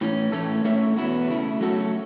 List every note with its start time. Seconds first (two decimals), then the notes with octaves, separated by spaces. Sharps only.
0.01 A2 E3 C#4
0.32 A2 E3 A3 C#4 A4
0.64 A3 C#4 A4 C#5 E5
0.97 E2 B2 B3 E4
1.28 C#3 A3 E4
1.60 F#3 A3 C#4 F#4 A4